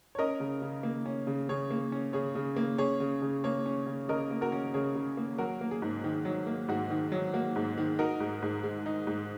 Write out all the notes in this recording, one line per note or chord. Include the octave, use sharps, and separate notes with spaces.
C#5
C#4 A#4 D#5
C#3
C#3
A#3
C#4
C#3
C#3 G#4 C#5
A#3
C#4
C#3 G#4 C#5
C#3
A#3
C#4 G#4 C#5
C#3
C#3
A#3 G#4 C#5
C#4
C#3
C#3 A#4 D#5
A#3
F#4 A#4
C#4
C#3 G#4 C#5
C#3
A#3
F#3 F#4 A#4
A#3
G#4
G#2
D#3
F#3
A#3
G#2 F#4
D#3
F#3
A#3 F#4
G#2
D#3
D#4 F#4 A#4
G#2
G#2
G#3
D#4
G#2